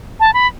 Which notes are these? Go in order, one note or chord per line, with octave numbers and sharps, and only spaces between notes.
A5
B5